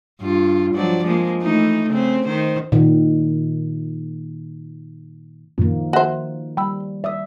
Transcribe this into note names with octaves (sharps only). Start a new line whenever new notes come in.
G2 F4
F3 F#3 D5
F3 G#3 A#3
E3 A3 D#4
C#3 C4
D#3 C5
A#2 D#3
F#2 A#2 D#3 F3 A#3
F#4 C5 E5 F#6
G3 G5 B5 E6
D5 E5 D#6